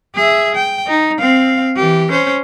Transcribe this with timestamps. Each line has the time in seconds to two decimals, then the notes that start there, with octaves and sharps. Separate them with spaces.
0.15 G#4 E5
0.56 G5
0.87 D#4
1.19 C4 F5
1.76 E3 G4
2.11 C#4 C5